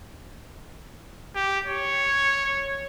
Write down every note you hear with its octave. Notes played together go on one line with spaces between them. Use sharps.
G4
C#5